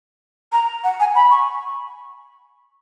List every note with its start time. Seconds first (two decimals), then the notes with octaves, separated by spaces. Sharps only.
0.52 A#5
0.84 F#5
1.00 G#5
1.15 B5
1.31 C#6